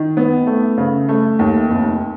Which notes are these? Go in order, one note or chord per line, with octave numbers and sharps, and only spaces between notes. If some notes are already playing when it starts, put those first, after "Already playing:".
Already playing: D#3
B3
A3
C#3
A3
D#2
F1